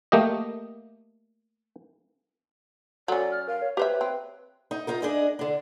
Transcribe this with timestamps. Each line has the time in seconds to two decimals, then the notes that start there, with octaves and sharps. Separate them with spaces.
0.12 A3 A#3 G4 D#5
3.08 F#3 C#4 A4 D5
3.32 F6
3.48 A#4 F5
3.62 C#5
3.77 G4 B4 C5 E5
4.01 C4
4.71 D#4
4.87 D#4 F4 A#4
5.02 D4 G#4 D#5
5.39 D3 D4